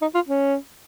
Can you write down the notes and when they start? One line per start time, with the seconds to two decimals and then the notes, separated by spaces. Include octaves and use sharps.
0.02 D#4
0.15 F4
0.28 C#4